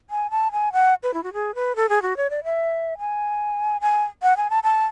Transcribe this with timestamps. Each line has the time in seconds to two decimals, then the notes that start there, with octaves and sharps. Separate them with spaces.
0.10 G#5
0.30 A5
0.52 G#5
0.73 F#5
1.03 B4
1.14 E4
1.23 F#4
1.33 G#4
1.55 B4
1.76 A4
1.89 G#4
2.02 F#4
2.17 C#5
2.30 D5
2.44 E5
2.98 G#5
3.81 G#5
4.23 F#5
4.37 G#5
4.50 A5
4.63 A5